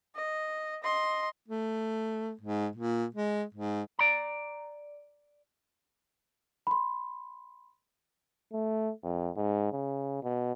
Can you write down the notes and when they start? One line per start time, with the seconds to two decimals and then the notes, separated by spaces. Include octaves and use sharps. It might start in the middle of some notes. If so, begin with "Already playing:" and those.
0.15 D#5
0.83 D#5 C6
1.48 A3
2.41 G#2
2.76 A#2
3.14 G#3
3.55 G#2
3.99 D5 A#5
6.67 B5 C6
8.53 A3
9.04 F2
9.37 G#2
9.72 C#3
10.23 B2